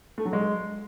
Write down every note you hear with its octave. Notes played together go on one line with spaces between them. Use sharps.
A3
F#3
G#3